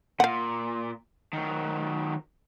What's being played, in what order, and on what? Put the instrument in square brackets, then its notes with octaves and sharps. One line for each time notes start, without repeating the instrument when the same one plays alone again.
[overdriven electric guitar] A#2 [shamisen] F5 F#5
[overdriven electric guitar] D#3 F#3